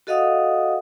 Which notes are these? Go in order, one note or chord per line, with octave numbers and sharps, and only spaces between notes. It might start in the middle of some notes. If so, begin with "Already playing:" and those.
F#4 A4 D#5 F5 F#5 D#6